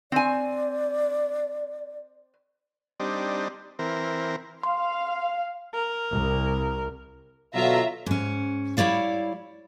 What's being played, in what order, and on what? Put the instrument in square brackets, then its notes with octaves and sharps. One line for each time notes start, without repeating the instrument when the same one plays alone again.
[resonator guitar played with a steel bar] C4 G#5 [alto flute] D5
[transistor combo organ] G3 C4 D4 D#4
E3 C4 A#4
[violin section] F5 [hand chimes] C6
[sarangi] A#4
[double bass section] C2
[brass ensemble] B2 D3 F#3 [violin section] F4 E5 A#5
[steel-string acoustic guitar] G#2 C#4
G3 E4 C#5 D5 F5